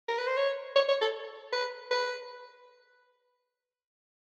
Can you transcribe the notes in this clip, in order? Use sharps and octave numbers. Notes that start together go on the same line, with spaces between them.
A#4
B4
C5
C#5
C#5
C#5
A4
B4
B4